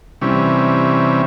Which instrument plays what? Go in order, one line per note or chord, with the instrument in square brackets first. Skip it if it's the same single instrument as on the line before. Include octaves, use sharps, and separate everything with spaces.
[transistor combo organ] C3 E3 G3 C#4